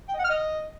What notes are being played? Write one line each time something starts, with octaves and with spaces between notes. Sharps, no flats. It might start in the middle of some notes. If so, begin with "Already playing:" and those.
G5
D#5
F#5
F6
D#5